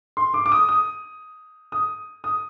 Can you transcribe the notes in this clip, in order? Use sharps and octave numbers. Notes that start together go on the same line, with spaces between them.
C6
D6
D6
D#6
D#6
D#6
D#6